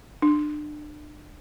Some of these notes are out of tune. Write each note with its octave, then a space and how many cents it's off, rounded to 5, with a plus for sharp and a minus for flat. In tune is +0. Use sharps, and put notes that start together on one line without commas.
D4 +30